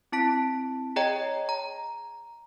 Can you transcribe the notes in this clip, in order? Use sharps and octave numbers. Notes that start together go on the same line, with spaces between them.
C4 E4 A5 B6 D7
G#4 C#5 D#5 G5 A#5 G#6
A#5